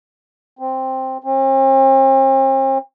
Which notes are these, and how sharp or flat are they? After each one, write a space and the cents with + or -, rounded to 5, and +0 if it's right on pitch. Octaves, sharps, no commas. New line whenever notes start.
C4 +5
C4 +45